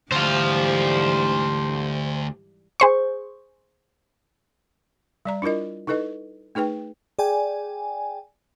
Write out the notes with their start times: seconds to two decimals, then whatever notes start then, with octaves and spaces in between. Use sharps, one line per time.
0.12 D2 G#2 E3 G3 C5 F5
2.80 G#4 C5 C#6
5.25 G3 D5 A#5
5.42 D4 E4 F4 A#4 D#5
5.87 D#4 E4 A4 B4 D#5
6.55 A3 D#4 G#4 B4 G5
7.19 G#4 D5 G5 G#5